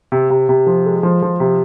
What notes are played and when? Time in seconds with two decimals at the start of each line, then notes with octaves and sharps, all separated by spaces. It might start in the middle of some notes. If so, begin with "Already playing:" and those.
0.12 C3
0.30 C3
0.49 C3
0.67 F3
0.86 G#3
1.03 F3
1.22 F3
1.40 C3